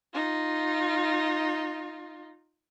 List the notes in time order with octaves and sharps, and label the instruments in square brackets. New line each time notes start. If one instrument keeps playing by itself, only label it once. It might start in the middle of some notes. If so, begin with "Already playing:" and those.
[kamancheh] D#4 F4